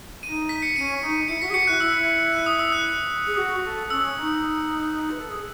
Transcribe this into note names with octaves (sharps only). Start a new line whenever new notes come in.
D#4 D#7
B6
C#7
C#4 D#7
D#4
E4 C#7
F#4 B6
G#4
F#4 C#7
E4 F#6
E4 E6
F#6
D#6
E6
F#6
G#4
F#4
A4
C#4 E6
D#4
B4
A4
G#4